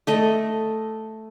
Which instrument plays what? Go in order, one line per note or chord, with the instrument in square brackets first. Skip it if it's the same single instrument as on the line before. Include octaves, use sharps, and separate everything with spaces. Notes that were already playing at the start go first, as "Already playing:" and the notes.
[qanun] A3 A4 D#5